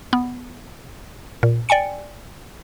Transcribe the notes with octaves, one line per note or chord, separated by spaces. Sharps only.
B3
A#2
D5 G5 G#5 C#7